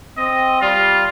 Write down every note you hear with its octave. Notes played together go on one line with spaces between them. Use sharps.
C4 D#5
G3 F4